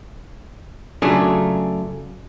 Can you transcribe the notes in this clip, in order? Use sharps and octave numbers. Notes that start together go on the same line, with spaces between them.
F#2 C#3 A3 D4 F4 G#4